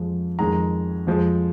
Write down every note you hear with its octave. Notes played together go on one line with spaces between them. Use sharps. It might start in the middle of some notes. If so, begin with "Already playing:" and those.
Already playing: F2 F3 G#3
F2 D#3 G#3 A#5
F2 F3 G#3